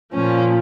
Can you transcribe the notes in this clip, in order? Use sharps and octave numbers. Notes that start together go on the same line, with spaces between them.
A#2 F3 C#4